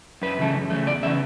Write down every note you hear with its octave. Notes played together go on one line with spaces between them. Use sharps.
F#2 B4
C#3 E3 A3
F#2
C#3 E3 A3
E2 D5
C#3 E3 B3 E5